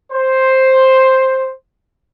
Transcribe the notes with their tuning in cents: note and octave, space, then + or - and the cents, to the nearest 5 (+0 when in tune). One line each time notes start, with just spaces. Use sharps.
C5 +5